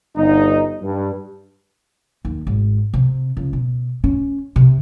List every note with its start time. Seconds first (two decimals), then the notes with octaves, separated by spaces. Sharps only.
0.16 G1 D#4
0.82 G2
2.25 D#2
2.47 G#1
2.94 C3
3.37 C#2
3.53 B2
4.04 C#4
4.56 C3